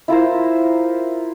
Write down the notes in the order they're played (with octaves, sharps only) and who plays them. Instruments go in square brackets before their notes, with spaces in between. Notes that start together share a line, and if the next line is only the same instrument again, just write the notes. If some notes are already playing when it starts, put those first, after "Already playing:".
[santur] E4 F4 A#4 C5